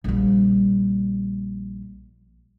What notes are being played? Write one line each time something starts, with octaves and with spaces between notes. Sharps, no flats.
A#1 G3